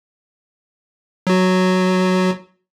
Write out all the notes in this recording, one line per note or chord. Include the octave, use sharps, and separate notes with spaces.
F#3 F#4